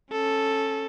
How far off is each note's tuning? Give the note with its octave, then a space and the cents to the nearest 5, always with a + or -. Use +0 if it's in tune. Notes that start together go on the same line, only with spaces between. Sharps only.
C#4 -20 A4 +0